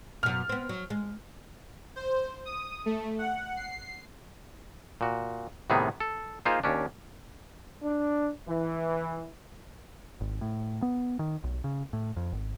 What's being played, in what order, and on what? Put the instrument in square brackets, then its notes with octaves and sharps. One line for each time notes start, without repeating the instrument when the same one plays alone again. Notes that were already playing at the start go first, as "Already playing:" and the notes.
[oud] F#2 B2 [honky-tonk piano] F6
[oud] B3 C4
F#3
G#3
[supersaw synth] C5
D#6
A3
F#5
C7
[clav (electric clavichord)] A#2 F#4
A2 C3 D#3 B3 D#4 G#4
A4
A#3 D#4 F4 G#4 C5 F5
D#2 C#4 D4
[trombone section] D4
E3
[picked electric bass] G#1
A2
B3
D#3
B1
C#3
A2
F2
G#1